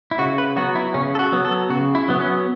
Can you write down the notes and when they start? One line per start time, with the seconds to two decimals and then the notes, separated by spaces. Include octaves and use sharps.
0.11 E4
0.18 C#3 F#4
0.38 B4
0.56 F#3 B3 F#4
0.75 E4
0.94 C#3 C#4
1.15 A4
1.19 F#4
1.32 F#3 B3
1.45 A4
1.70 C#3 F#4
1.95 E4
2.08 F#3 B3
2.20 C#4